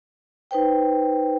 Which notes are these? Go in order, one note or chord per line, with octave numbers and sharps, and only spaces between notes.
D#4 B4 C5 G5